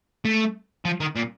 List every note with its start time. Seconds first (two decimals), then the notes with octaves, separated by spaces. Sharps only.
0.25 A3
0.85 F3
1.00 D#3
1.15 A#2